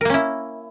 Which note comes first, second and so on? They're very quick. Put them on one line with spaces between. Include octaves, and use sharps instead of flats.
A#4 A#3 C#4 E4